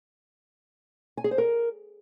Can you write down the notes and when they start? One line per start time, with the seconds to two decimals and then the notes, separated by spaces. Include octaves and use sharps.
1.17 G#5
1.24 G#4
1.31 C5
1.38 A#4